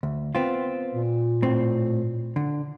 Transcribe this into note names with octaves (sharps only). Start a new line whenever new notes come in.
D2
B3 C4 F4
A#2
A2 C4
D3